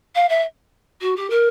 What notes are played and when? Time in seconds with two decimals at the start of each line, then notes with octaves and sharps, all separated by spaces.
0.15 F5
0.29 E5
1.01 F#4
1.16 G4
1.30 A#4